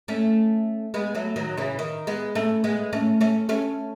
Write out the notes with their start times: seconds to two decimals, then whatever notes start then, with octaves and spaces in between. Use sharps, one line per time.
0.08 A3 C#4
0.94 G#3 B3
1.15 F#3 A3
1.36 D#3 F#3
1.57 C#3 E3
1.79 D#3
2.07 G#3 B3
2.35 A3 C#4
2.64 G#3 B3
2.93 A3 C#4
3.21 A3 C#4
3.49 A3 C#4